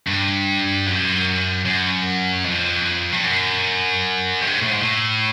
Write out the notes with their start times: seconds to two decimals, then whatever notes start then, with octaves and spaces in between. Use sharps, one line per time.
0.07 G2
0.86 F#2
1.65 F#2
2.44 F2
3.12 G2
3.23 F#2
4.41 G2
4.51 G#2
4.61 A2
4.70 G#2
4.81 A2